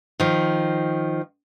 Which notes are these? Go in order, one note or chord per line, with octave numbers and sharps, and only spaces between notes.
D#3 F3